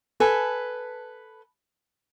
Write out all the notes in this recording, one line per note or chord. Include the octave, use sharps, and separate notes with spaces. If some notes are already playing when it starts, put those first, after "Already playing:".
A4 B4 G#5